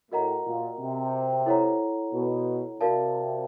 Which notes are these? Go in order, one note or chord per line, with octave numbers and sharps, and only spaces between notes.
A2 F#4 A#4 D#5 F#5 A#5
A#2
C3
E4 A4 C#5 F#5 A#5
B2
C3 F#4 A#4 D5 F5 A5